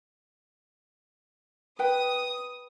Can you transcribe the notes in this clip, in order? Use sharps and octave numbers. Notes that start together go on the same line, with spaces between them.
B4 G5 D#6